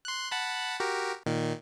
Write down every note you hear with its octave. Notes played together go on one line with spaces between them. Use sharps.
C6 F#6
F#5 A5 B5
F#4 G4 A#4
A#2 D#3